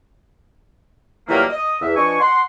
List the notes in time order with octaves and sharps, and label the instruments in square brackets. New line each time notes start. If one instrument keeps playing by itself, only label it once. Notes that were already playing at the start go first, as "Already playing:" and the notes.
[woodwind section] A#2 E3 F#3 G3 A3 A#3
D#5
E2 E5
F3 D4 B4 D#5 G#5 C#6
F#5 C6